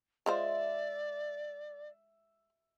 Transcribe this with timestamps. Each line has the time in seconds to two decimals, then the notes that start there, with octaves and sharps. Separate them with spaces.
0.26 G#3 F4 C5 D5 E5